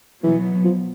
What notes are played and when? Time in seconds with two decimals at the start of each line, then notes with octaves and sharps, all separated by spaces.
0.23 B2 E3 F#3 B3
0.65 F3